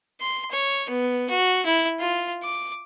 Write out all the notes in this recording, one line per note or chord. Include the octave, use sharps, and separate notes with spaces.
C6
C#5
B3
F#4
E4
F4
D6